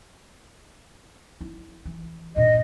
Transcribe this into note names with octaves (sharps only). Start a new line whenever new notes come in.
E4
E3
G2 A#2 D#5